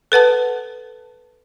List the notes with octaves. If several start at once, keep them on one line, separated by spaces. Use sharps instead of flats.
A4 B4 F#5 A5